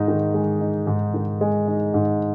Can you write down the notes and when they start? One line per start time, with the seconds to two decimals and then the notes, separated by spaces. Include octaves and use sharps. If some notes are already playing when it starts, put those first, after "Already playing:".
Already playing: G#2 G#3 D#4
0.08 D#3
0.34 G#3
0.61 D#4
0.87 G#2
1.14 D#3
1.41 G#3
1.68 D#4
1.94 G#2